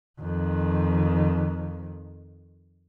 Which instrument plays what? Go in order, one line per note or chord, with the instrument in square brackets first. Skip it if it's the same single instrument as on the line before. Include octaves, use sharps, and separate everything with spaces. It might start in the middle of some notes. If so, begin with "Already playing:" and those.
[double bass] F2 D#3